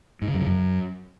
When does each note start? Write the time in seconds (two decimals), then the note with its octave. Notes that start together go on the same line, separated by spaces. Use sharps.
0.22 G#2
0.28 C#3
0.34 F#2
0.40 C#3
0.47 F#2